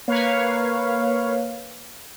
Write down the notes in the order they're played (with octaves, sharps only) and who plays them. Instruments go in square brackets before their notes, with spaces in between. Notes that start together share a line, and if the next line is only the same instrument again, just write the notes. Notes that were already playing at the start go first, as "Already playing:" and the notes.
[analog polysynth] A#3 B4 C#5 F5